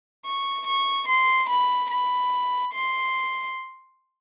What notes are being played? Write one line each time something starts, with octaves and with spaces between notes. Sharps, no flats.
C#6
C#6
C6
B5
B5
C6